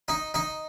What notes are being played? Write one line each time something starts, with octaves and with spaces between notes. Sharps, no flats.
D#4
D#4